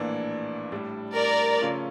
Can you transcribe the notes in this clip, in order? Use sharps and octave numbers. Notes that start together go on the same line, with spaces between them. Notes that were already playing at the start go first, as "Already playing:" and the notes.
Already playing: A#1 A2 E3 A#3 D4
A2 G3 D4
A#4 D5
C#3 F3 A3 C#4 F4